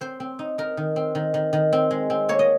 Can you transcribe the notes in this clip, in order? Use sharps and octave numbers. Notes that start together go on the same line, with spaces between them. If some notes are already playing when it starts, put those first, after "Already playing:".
C4 C5
C4
D#4
D#4 A#4
D#3
C4
D#3
D#3
D#3
C4
G#3
C4
A#3 C#5
D#5